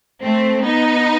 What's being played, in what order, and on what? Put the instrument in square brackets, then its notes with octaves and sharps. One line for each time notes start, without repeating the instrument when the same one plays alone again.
[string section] A3 C4
B3 D#4